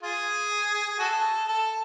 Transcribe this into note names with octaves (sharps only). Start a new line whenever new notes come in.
F4 G#4
G#4
F#4 A4
A4